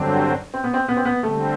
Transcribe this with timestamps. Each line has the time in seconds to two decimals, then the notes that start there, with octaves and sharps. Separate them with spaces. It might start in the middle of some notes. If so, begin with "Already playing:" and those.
Already playing: G2 D3 F#3 C4 D4
0.54 C4
0.64 B3
0.74 C4
0.88 B3
0.97 C4
1.05 B3
1.23 D3 G3 A3 C4